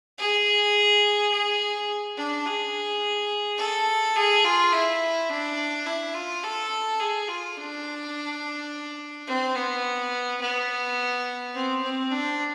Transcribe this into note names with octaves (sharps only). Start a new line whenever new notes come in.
G#4
G#4
D4
G#4
A4
G#4
F4
E4
D4
E4
F4
A4
G#4
F4
D4
C4
B3
B3
C4
C4
D4